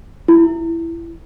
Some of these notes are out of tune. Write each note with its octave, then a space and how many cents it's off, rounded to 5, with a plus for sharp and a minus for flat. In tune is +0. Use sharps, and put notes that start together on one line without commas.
E4 +10